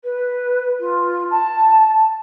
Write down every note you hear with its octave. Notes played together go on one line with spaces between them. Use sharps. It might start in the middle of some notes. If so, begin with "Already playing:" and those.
B4
F4
A5